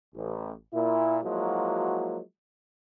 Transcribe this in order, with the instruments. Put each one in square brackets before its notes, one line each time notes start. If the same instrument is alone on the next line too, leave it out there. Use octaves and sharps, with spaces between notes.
[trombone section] A1
A#2 E4
F3 F#3 G#3 A#3 E4 F#4